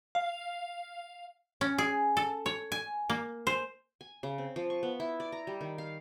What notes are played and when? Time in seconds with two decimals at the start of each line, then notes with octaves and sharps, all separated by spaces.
0.15 F5
1.61 C#4
1.78 G#4
2.17 A4
2.46 C#5
2.72 G#5
3.10 A#3
3.47 C5
4.01 G#5
4.23 C#3
4.38 C4
4.56 F3
4.70 C#6
4.83 B3
5.00 E4
5.20 D5
5.32 A#5
5.47 G3
5.61 D#3
5.78 F5